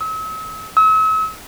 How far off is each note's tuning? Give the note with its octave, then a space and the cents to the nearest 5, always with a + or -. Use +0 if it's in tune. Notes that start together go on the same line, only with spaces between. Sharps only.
E6 -40
E6 -40